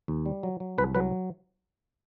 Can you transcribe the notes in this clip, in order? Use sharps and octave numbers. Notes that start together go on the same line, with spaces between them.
D#2
G3
F#3
F#3
C2 B4
F#3 B4